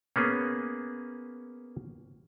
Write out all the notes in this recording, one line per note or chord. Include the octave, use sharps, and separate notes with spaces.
A#3 B3 C#4 G#4